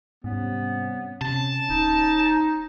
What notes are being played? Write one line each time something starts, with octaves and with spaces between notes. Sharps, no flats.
G#2 C3 G3 B3 C#4
C3 C#4 A5
D1 D#4